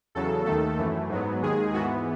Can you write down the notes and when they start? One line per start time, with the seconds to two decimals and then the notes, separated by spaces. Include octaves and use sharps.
0.15 E2 C#3 F#3 A4
0.46 D#2 D#3 A3 A4
0.78 F#2 E3 A3
1.10 G#2 F#3 B3
1.42 D#2 D#3 G#3 G#4
1.74 G#2 E3 B3 F#4